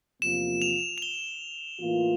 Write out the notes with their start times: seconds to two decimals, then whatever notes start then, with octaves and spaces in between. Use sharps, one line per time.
0.22 E2 C3 F3 A#3 F4 E7
0.62 F7
0.98 F7
1.02 G7
1.81 A2 E3 A#3 F4